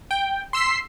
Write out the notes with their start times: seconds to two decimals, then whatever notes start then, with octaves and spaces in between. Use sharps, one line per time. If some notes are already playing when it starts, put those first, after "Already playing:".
0.11 G5
0.53 C6 E6 B6 C7